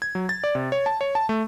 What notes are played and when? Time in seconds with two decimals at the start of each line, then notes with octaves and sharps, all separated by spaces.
0.02 G#6
0.15 F#3
0.29 A6
0.44 D5
0.55 C3
0.72 C#5
0.86 A5
1.01 C#5
1.15 A5
1.29 A3